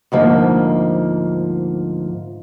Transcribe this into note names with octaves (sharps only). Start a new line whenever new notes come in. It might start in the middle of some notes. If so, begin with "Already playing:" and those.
D2 G#2 F3 A#3